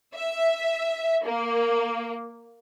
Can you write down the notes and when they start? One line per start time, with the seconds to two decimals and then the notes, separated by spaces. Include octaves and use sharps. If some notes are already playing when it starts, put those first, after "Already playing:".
0.15 E5
1.24 A#3